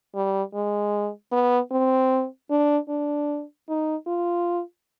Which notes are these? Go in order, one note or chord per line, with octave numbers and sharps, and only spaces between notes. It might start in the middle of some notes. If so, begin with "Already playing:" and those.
G3
G#3
B3
C4
D4
D4
D#4
F4